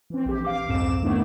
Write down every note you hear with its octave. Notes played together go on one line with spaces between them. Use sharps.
E3 C4
A#1 G4
F5 D6
C2 F2 G#2 C4 D6 E7
D#3 A3 B3 D4 E4